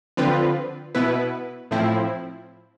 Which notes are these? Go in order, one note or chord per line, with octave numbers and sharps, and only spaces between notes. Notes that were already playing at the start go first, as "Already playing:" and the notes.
D3 F3 C4 F4 B4
B2 B3 E4 B4
A2 F3 C4 E4